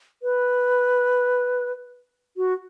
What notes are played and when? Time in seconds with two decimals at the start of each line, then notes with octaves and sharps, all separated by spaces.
0.23 B4
2.37 F#4